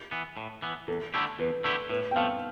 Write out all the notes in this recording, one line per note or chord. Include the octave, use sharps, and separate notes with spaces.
E3 B3
A2
E3 B3
E2 A4
D3 A3 E4 G4
E2 B4
D3 A3 E4 G4
A2 B4
G5
F3 A3 F5